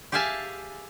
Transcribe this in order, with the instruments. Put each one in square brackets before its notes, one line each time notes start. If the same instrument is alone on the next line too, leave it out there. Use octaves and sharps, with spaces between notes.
[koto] G4 G#4 E5 F5 G#5 A5